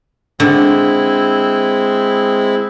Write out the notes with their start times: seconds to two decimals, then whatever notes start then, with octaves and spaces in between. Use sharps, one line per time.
0.40 D3 G#3 C4 E4